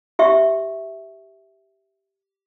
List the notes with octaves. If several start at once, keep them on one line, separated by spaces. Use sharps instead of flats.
G4 E5 C#6